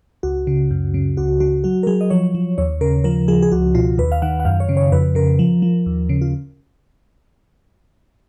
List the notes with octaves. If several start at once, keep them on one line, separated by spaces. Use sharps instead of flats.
C#2 F#4
C#3
F#2
C#3
C#2 F#4
C#3 F#4
F#3 F#4
A#4
F#3 G#4
D#5
F3 C#5
F3
D#2 C#5
C#3 A#4
F3 A#4
F3 G#4
G#4
C#2 F#4
B2 F4
D#2 B4
F5
D#3 F#5
F#5
F#2 F5
C#5
C#3
C#5
F2 B4
C#3 A#4
F3
F3
D#2
C#3
F4